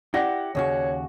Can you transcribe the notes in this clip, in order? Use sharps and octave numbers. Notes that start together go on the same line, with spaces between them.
E4 G4 D5 F#5 A#6
D#2 C#3 F#4 C#5